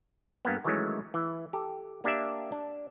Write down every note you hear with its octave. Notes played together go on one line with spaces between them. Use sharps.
G2 A#3 B3
D#3 E3 F#3 G#3 A3 C#4
E3
G4 A4
A#3 D4 G4 D5 E5
D4